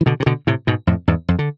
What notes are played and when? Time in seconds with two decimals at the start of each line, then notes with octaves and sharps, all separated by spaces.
0.01 E3
0.06 B2 D3
0.20 C3
0.26 B2 D3
0.47 A2 C3
0.67 G#2 B2
0.87 F2 A2
1.08 E2 G#2
1.28 F2
1.39 D3